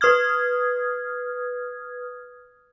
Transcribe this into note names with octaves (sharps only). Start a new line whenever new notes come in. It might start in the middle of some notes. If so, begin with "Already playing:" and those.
B4 D#6 F6 G#6